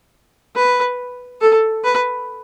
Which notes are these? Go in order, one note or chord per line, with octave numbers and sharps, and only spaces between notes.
B4
A4
B4